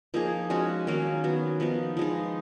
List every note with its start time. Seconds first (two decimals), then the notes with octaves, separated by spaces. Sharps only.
0.14 F3 A#3 D#4 G#4
0.50 F3 G#3 C#4 F#4
0.87 D#3 F#3 A#3 C#4
1.24 F#3 B3 F#4
1.60 F3 B3 D#4 A#4
1.97 F3 G#3 D#4